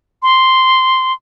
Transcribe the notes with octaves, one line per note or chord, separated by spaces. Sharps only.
C6